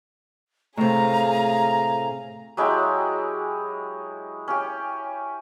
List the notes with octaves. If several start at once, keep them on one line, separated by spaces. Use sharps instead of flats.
A2 C3 G#4 F5 A#5
F#3 G#3 E4 G4
C#4 G4